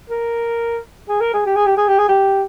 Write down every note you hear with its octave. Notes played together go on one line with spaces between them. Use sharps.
A#4
G#4
A#4
G#4
G4
G#4
G4
G#4
G4
G#4
G4